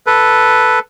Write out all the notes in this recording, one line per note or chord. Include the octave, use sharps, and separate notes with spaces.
A4 B4